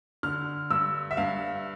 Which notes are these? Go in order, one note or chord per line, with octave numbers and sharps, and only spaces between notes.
D3 F6
G2 E6
E5
G2 F5